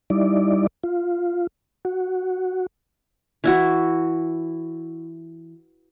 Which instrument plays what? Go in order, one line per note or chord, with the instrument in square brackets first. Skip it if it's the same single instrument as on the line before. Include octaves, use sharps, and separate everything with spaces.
[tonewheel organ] G3 D#4 E4 D5
F4
F#4
[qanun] E3 E4 F#4